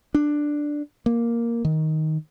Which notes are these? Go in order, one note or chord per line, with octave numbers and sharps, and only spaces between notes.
D4
A#3
D#3